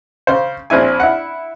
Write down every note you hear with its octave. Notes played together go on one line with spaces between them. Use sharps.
C#3 C5
A#1 C4 E4 G#5
E4 F#5